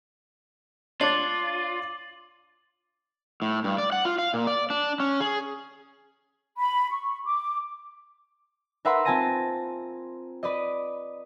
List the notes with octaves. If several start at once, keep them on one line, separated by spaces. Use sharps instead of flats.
D4 F4 C#5 D6 A6 F#7
A2
G2
D5
F#5
F4
F5
A#2
D5
D4
C#4
G#4
B5
C#6
D6
A#4 B4 E5 F#5 B5 C6
C4 F4 G#5 A5 A#6 D#7
B4 D5 D#5